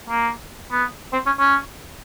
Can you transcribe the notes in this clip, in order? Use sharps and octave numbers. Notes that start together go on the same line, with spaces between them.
A#3
B3
C4
C#4
C#4